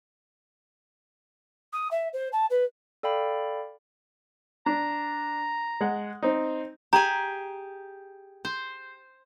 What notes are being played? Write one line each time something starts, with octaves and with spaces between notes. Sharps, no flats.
D#6
E5
C5
A5
B4
A4 D5 F5 G5 B5
D4 A#5
G#3 F#5
C4 D#4
G4 G#4 G#5 A#5
C5